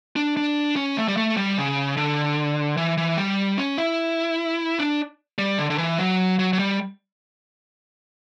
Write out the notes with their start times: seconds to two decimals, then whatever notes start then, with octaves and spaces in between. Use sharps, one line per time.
0.16 D4
0.37 D4
0.76 C#4
0.97 A3
1.08 G3
1.17 A3
1.37 G3
1.57 C#3
1.97 D3
2.77 E3
2.97 E3
3.17 G3
3.58 C#4
3.77 E4
4.79 D4
5.38 G3
5.58 D3
5.70 D3
5.78 E3
5.99 F#3
6.39 F#3
6.53 F#3
6.59 G3